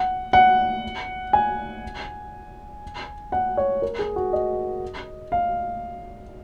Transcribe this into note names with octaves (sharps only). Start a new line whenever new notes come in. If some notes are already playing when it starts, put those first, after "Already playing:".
Already playing: F#5
F#5
G#5
F#5
C#5
A#4
G#4
F#4
D#5
F5